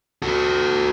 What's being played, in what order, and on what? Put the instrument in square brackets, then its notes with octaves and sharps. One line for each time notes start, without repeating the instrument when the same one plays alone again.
[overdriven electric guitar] F#4 A4